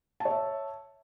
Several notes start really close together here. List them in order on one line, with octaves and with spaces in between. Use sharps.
A5 C#5 E5